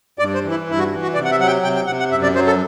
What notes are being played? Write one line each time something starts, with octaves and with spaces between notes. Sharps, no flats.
G2 D5
C5
E3
E4
G2 E4
F#4
E3
F#4
C3 D5
F#5
E5
F#3 F#5
G5
C3 G5
G5
C3 F#5
F#5
F#2 E5
D5
F#3 C5
A4